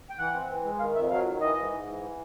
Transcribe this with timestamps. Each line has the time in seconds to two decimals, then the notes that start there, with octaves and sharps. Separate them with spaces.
0.10 G5
0.18 E3 F#5
0.34 C4
0.49 E3
0.64 G#3
0.80 D#3 F5
0.95 F2 E5
1.10 F#3 F5
1.26 D#3
1.41 E3 D#5
1.56 G#2
1.72 G#2
1.88 E3